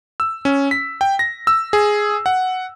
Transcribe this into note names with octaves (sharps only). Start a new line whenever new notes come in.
E6
C#4
B6
G5
A#6
E6
G#4
F#5